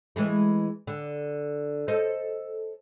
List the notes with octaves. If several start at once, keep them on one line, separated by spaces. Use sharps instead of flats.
E3 G#3 A3
D3
A4 C5 D#5